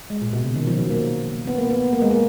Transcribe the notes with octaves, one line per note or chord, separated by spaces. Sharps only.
G#3
A#2
B2
C#3
D#3
F3
F#3
A#3
B3
A#3
B3
A#3
G#3
A#3